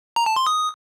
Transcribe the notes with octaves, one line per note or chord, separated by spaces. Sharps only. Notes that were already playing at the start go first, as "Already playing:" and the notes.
A#5
A5
C6
D#6